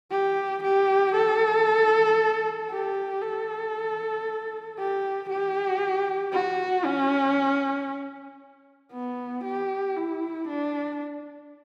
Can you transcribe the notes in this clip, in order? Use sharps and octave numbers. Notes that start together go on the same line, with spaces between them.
G4
G4
A4
G4
A4
G4
G4
F#4
C#4
B3
G4
E4
D4